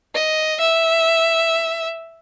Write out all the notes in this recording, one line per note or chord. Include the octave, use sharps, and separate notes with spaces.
D#5
E5